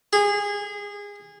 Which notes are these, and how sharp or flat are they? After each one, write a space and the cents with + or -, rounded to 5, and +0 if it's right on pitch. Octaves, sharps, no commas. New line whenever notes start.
G#4 -25